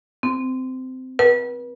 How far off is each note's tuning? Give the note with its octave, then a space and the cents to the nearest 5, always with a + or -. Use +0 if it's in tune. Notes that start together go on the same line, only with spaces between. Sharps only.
C4 -20
B4 -35